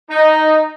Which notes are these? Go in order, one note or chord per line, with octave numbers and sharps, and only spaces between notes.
D#4